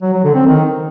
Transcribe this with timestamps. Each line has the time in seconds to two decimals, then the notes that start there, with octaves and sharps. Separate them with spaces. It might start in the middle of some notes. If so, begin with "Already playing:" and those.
0.02 F#3
0.13 F#3
0.24 D3
0.35 C4
0.46 D#3